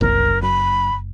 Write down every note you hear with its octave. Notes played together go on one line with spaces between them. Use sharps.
F#1 C2 A#4
F#2 B5